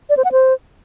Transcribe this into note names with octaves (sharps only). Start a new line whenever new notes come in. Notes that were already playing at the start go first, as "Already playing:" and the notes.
D5
C5
F#5
C5